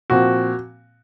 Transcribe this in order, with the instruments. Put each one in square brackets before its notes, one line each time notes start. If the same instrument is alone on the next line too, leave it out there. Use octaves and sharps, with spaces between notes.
[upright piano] A#2 F3 C4 [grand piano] F#4